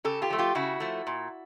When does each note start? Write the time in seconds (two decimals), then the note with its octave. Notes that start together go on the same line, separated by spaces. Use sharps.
0.05 C#3 G4 A4
0.22 F4 G4
0.30 F3 A3
0.38 F4 G4
0.55 C#3 E4 F#4
0.80 F3 A3
1.07 A#2